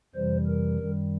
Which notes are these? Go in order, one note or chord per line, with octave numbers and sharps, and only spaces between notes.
F2 C3 E3 G3 C5
A#4
F#2 D#3 G3